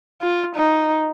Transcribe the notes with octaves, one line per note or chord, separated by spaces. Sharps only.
F4
D#4